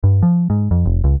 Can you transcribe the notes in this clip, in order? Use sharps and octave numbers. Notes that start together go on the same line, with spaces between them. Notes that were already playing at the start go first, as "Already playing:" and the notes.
G2
F3
G#2
F2
F1
C#2